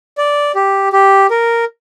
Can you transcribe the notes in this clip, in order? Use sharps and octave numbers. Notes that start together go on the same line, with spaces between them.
D5
G4
G4
A#4